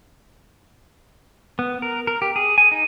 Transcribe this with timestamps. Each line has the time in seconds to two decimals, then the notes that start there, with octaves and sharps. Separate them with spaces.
1.59 B3
1.82 A#4
2.07 A#4
2.22 G4
2.36 G#4
2.58 G#5
2.71 D#4